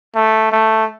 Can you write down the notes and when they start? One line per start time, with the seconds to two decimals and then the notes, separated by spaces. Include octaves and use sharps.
0.15 A3
0.52 A3